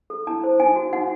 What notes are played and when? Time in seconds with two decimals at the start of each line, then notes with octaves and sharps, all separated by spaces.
0.10 A4
0.27 E4 A5
0.44 C5
0.60 D#4 G#5
0.76 F#4
0.93 D#4 F#5